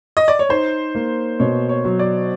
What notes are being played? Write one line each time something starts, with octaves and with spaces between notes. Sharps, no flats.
D#5
D5
C#5
D#4 C5
A#3
B2 C#5
C#5
F#3
D5